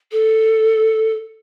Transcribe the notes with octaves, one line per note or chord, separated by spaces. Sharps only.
A4